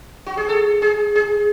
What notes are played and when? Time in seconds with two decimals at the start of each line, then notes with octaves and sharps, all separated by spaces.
0.26 F#4
0.37 G#4
0.49 A4
0.82 G#4
1.15 G#4